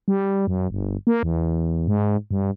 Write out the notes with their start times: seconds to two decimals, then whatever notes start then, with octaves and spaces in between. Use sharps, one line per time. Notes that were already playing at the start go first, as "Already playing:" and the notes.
0.08 G3
0.47 F#2
0.70 G1
1.07 A#3
1.23 E2
1.87 G#2
2.31 G2